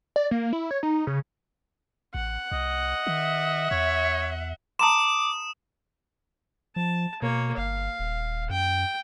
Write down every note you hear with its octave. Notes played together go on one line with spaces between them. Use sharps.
D5
A#3
E4
C#5
D#4
C#3
A1 F#5
C2 D#5
D#3 E5
E2 C#5
A5 A#5 C6 D6 D#6 E7
F3 A5
B2 A#3 C#5
G1 F5
D#1
F#2 G5